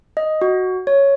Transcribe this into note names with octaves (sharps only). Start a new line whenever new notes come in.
D#5
F#4
C#5